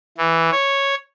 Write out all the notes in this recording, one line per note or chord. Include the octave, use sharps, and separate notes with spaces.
E3
C#5